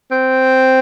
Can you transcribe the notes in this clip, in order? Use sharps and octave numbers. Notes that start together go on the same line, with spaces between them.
C4